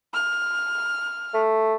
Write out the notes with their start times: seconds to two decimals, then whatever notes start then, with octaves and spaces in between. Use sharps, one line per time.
0.14 F6
1.34 A3